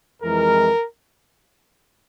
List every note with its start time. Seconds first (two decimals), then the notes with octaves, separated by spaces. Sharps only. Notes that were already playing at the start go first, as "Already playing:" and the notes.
0.22 F2 E3 G#3 A#4